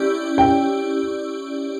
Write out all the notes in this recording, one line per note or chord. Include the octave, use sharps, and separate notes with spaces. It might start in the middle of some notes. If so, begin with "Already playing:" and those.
Already playing: C#4 E4 G4 D5
G5